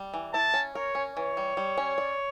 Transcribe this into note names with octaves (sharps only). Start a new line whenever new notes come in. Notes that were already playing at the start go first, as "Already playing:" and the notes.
Already playing: G3
E3
E4 A5
C#4
A#4 C#5
C#4
E3 C#5
G3
G3
C#4
D5